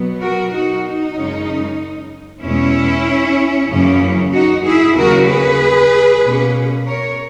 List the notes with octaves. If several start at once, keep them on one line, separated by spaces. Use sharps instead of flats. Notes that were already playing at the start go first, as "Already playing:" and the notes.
Already playing: B2 F#3 B3
F#4 A#4
D#4 F#4
D#4
F#2 C#3 G#3 C#4
E2 B2 G#3 C#4 E4
F#2 C#3 E3 A#3 C#4
D#4 F#4
E4 G#4
D#2 C#3 F#3 A#3 F#4 A#4
G#4 B4
B2 A#3 C#4
A#4 C#5